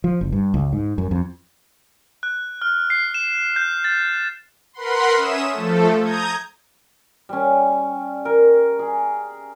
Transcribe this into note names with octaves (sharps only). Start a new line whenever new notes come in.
F3
F#1
G2
C#2
G#2
F#2
F2
F#6
F6
C7
E7
G6
A6
A#4 B4 F#5 B5 C6
C#4 E5 D#6 E7
F3 A3 A4
A#5 D#6 G6 G#6
G3 C#4
A#4
G#4